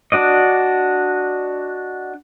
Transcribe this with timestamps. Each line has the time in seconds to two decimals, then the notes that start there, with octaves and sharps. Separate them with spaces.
0.12 D4 F#4 D5 D#5